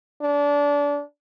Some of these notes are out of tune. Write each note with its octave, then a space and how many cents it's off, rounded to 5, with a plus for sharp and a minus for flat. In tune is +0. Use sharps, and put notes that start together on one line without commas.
D4 -25